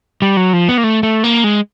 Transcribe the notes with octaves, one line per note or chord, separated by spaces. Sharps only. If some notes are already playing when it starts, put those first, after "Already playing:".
G3
F#3
F3
B3
A#3
A3
A3
A#3
G#3